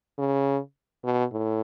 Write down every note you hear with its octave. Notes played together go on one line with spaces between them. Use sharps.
C#3
B2
A2